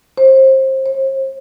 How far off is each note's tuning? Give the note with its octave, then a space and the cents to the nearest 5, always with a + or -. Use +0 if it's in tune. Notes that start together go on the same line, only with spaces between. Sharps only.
C5 +25
C5 +45